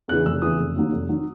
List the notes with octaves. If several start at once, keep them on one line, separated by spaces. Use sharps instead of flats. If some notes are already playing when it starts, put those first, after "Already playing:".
E2 C#3 E3 F#6
F1 E6
E2 C#3 E3 D#6
F1
D#2 D#3 F#3
F1
D#3 F#3